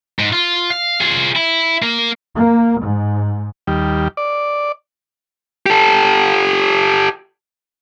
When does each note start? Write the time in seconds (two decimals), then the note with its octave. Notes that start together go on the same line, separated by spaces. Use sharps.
0.19 G#2
0.33 F4
0.70 F5
1.00 F4 G#4
1.36 E4
1.82 A#3
2.35 A#3
2.81 G#2
3.67 D#2 G3
4.17 D5
5.66 G4 A4